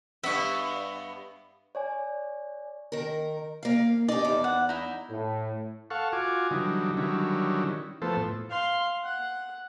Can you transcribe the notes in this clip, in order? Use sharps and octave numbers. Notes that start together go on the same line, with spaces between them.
G2 B3 E5 C#6
C#5 D5 G#5
D#3 A#4
A#3 F5
D#4 G4 D5
E2
F#5
D#4 E4
A2
A4 F5 F#5 C#6
F4 F#4 G#5 D6
D3 E3 F#3 G3 D#4
D3 D#3 F#3 G3 C#4 E4
E3 F3 A3 B3 A4 C5
A2
F5 C6
F#5